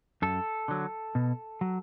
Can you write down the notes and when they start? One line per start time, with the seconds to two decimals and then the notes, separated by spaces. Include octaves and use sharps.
0.22 F#2 A4
0.68 D3 F#3
1.15 B2
1.61 F#3